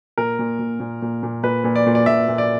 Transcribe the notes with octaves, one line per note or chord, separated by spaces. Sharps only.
A#2 A#4
A#2
A#2
A#2
A#2
A#2
A#2 B4
A#2
D5
A#2
D5
A#2 E5
A#2
D5